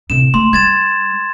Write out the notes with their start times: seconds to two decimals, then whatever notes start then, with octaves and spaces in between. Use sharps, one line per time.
0.10 A2 C3 E7
0.34 A3 C6
0.53 G3 G#6 A6 E7